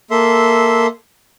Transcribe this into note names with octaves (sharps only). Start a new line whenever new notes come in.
A#3 A4 E5 C6